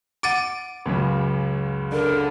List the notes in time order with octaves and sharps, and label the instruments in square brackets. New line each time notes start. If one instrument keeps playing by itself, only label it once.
[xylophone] F#5 A6 D7 [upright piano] D6 D#7
[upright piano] C#2 F#2 C#3
[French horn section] D3 [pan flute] A#4